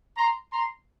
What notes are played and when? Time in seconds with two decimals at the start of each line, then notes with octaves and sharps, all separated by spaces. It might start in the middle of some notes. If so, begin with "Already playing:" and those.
0.17 A#5 C6
0.53 A#5 C6